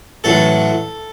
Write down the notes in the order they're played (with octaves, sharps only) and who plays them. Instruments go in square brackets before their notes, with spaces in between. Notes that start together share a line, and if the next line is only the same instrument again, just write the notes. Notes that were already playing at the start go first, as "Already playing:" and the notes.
[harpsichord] A1 A2 F#3 A4